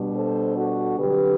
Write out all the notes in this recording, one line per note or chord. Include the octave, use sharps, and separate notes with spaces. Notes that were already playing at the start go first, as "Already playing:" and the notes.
Already playing: B2 G3 D4
A4 C5
F#4 A4
D3 F#3 C4 G4 B4